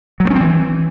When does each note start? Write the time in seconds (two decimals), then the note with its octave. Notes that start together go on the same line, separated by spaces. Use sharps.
0.20 F#3
0.25 A3
0.30 C#4
0.36 C4
0.41 E3